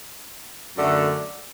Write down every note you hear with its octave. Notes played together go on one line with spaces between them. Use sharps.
F#2 D3 A3